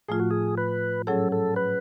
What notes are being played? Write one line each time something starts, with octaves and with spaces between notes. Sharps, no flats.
A2 F3 A3 F4 G#4
F#4
G#4
B4
G#2 F#3 C#4 G#4 A4 C#5
A4
B4